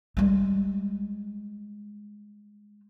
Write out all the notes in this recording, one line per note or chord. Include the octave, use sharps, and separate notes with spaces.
G3 G#3